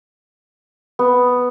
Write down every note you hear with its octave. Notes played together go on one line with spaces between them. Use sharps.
B3